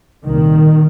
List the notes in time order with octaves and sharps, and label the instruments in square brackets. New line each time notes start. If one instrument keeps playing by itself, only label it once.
[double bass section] C2 A#2 D#3